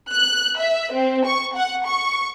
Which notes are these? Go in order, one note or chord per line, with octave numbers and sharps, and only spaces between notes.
F#6
E5
C4
C#6
F#5
C#6